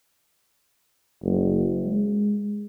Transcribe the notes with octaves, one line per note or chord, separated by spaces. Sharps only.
F#1
G#3